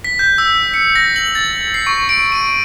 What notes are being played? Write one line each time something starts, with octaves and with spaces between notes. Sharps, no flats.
B6
G6
E6
C#7
A#6
F#7
A6
C7
C#6
D7
D#7